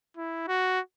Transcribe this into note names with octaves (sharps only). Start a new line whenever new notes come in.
E4
F#4